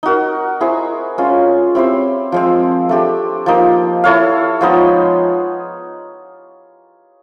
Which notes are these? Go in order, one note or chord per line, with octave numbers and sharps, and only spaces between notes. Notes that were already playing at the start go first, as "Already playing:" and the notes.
D#4 F#4 A#4
E4 G#4 C5
G#3 C#4 F4
C4 E4 G4 C5
F3 G#3 C4
A3 D4 G4
F3 A#3 D#4
E4 A4 C#5 F5
F3 G#3 B3 D#4